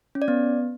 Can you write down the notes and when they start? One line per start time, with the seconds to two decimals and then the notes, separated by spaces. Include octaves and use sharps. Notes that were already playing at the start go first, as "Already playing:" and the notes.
0.15 C#4
0.22 D5
0.28 B3